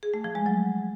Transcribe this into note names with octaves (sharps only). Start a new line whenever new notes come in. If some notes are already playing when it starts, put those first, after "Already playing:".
G#4
A3
F3
G#3
F#3